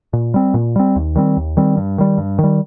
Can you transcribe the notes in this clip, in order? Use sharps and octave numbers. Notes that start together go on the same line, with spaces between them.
A#2
G3 C4
A#2
G3 C4
D#2
D#3 G3 C4
D#2
D#3 G3 C4
G2
D#3 G3
G2
D#3
G3